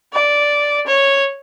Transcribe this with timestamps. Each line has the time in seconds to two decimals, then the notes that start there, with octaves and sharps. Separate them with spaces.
0.13 D5
0.86 C#5